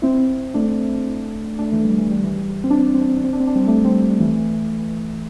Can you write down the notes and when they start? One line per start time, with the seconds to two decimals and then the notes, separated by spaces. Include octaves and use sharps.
0.02 C4 E4
0.54 A3 D4
1.58 A3 D4
1.72 E3 A3
1.85 G3
1.98 E3
2.11 G3
2.24 E3
2.37 G3
2.50 G3
2.64 C4
2.70 D4
2.79 C4
2.87 D4
2.94 C4
3.01 D4
3.09 C4
3.17 D4
3.24 C4
3.33 D4
3.40 C4
3.47 D4
3.56 G3 C4
3.67 A3 D4
3.85 G3 C4
4.02 G3
4.19 E3 A3